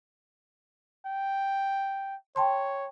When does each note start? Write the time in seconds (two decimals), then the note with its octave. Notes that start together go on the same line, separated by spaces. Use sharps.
1.06 G5
2.36 C#5 G5 A5 C6